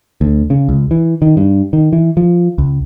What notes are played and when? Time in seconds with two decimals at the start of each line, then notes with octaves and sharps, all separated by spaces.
0.21 D2
0.50 C#3
0.69 C#2
0.91 E3
1.22 D#3
1.37 G2
1.73 D#3
1.93 E3
2.17 F3
2.58 C#2